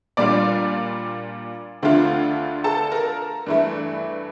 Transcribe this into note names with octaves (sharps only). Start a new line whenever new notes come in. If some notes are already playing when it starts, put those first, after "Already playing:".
A#2 G3 D4 F4 D5 D6
D2 D3 A3 D4 F4
A4 A5
A#4 A#5
G2 E3 A3